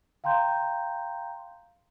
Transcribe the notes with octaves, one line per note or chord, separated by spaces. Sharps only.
F5 G5 A#5 C6 G6